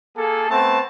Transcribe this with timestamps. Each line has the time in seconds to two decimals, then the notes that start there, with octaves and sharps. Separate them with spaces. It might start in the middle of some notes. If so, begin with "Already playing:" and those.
0.18 A#3 G#4 A4
0.50 A3 B3 C4 A5